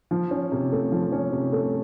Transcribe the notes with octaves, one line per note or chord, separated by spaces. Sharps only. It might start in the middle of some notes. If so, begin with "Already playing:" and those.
F3
C#4
C3
A3
F3
C#4
C3
A3